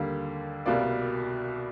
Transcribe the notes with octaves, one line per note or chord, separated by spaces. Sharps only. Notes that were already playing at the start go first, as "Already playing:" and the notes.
Already playing: D#2 D3 G3 A#3
C2 B2 G3 A#3 D5